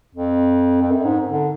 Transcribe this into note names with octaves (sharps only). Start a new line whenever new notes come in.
F2
F2
F#2
G#2
D3